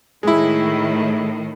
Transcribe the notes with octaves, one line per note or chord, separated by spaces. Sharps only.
A2 D#3 G#3 E4